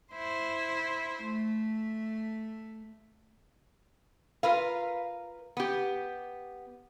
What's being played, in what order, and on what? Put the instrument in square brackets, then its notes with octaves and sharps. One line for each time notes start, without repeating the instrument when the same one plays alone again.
[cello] E4 C5
A3
[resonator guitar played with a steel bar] F4 A#4 B4 F5
B3 G4